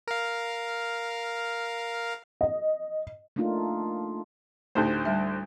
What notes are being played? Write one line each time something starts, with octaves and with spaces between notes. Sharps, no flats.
A#4 F5
D#5
A3 A#3 D4 D#4 F4
D2 A2 A3 D#4 G4 C5
G3 E5